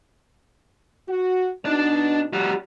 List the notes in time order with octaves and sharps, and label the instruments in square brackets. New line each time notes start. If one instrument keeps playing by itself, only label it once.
[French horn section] F#4
[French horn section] B2 D#4 [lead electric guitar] D4 D5
[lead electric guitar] G3 F#4